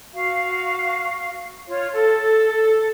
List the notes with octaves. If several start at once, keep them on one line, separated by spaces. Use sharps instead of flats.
F#4 F5
F4 C#5
A4